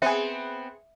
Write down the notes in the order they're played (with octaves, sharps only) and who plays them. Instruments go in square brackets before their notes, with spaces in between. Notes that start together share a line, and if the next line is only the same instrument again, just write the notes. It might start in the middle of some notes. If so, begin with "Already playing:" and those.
[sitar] B3 C4 B4 [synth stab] G#4 C#7 [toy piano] E5